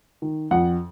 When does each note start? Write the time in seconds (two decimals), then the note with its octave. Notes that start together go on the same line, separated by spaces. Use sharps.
0.22 D#3
0.51 F2 F#5